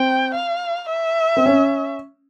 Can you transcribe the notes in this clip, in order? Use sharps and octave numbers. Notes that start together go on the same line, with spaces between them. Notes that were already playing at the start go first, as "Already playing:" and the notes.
Already playing: C4 G5
F5
E5
C4
C#4